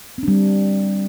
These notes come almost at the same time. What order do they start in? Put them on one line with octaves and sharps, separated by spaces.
C4 D4 G3